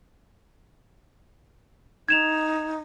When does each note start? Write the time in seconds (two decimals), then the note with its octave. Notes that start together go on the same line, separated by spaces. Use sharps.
2.08 D#4 G#6 E7 F7